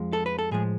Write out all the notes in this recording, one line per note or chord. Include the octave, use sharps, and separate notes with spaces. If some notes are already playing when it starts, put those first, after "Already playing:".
Already playing: F2 F3 G#3
A4
B4
A4
A2 F3 G#3 G#4